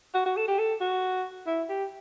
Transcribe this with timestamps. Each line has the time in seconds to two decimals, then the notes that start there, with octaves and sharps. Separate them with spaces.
0.14 F#4
0.26 F#4
0.37 A4
0.48 G4
0.59 A4
0.81 F#4
1.47 E4
1.69 G4